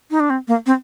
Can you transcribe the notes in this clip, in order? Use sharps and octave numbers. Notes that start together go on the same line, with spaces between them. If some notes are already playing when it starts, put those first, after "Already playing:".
D#4
D4
C4
A#3
C4